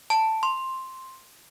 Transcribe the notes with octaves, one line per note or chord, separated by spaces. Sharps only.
A5
C6